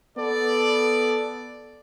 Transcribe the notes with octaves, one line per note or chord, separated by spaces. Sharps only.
B3 A4 D5